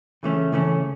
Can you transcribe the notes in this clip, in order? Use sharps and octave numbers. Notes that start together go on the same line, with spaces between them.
C#3 E3 A3 C#4
C#3 E3 A3 C#4